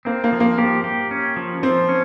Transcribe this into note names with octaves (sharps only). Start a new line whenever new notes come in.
A#3 C4
A#3
F3
A#3
A#3 G4
G4
C#4
F3
F3 C4
C#4